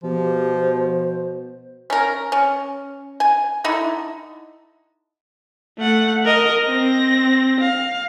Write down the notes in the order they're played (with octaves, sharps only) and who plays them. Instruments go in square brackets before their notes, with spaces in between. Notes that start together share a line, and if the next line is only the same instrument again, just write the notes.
[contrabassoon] B2 [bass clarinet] F3 [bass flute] G4
[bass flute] C5
[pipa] C#4 A#4
C#4
G#5
D3 D#4 E4
[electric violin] A3 F#5
A#4 D#5
C4 A#6
F5